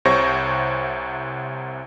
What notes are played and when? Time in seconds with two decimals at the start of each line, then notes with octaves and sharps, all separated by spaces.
0.05 C2 C3 C5 C#5 C#6 A#6